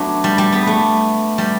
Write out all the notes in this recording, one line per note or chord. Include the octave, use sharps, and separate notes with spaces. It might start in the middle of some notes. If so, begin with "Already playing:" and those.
Already playing: F#3 A3 B3 D4
G3
G3
B3
A3
G3